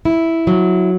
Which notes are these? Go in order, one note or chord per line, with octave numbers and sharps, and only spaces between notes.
E4
F#3